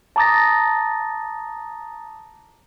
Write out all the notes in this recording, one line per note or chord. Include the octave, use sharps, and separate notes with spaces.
A5 A#5 D6 D#6 A6 A#6